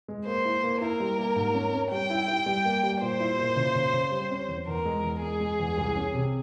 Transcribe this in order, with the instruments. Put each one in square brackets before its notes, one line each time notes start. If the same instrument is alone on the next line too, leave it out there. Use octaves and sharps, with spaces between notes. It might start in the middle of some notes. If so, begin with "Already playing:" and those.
[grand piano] G#3
[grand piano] A#3 [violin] C5
[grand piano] E4
A#3
[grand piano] E4 [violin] A#4
[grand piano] G3
A#3
G#2
C#4
C#4
[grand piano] G3 [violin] G5
[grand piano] E4
E4
G3
A#3
G3
[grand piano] A#2 [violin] C5
[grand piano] E4
A#2
C#3
C#3
C#3
G3
C#4
E2
[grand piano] E2 [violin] A#4
[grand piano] G#3
E2
[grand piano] G#3 [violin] G#4
[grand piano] G#3
E2
C2
C#4
C3